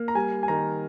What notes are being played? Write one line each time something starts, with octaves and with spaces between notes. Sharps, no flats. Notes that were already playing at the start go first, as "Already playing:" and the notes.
Already playing: A#3
A#5
G3 G#5
G#5
D#3 A#5